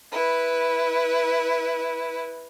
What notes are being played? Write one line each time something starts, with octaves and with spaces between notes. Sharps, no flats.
E4 B4